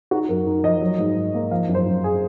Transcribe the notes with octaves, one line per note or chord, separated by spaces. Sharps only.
D#4 F#4
F#2 A#4
D#4
F3 D#5
F#3
G#2
G#2
A#3
F3 F5
F#2
C5
F#2
G#4